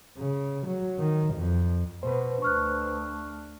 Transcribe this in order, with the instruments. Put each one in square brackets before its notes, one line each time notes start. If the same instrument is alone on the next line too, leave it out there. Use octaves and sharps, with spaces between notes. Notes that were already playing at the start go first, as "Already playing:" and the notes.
[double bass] C#3
F#3
D#3
F2
[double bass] B2 [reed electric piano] B4 C5
[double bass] D2 D4 [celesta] C#6 F6 F#6